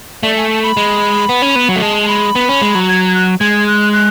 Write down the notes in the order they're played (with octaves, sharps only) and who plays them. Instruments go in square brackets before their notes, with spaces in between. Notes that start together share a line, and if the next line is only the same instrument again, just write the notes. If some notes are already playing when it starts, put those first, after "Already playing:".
[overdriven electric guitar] A3 [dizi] D5
[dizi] G#5
A5
B5
[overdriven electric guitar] G#3
B3
C#4
B3
F#3
A3
[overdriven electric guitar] G#3 [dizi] A5
[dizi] A5
B5
[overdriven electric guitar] B3
C#4
G#3
F#3
[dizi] G#6
G#6
F#6
[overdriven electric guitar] G#3 [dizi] G#6
[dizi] F#6
F#6